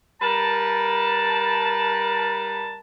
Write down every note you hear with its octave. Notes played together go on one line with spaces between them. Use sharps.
G3 A#4 B4 A5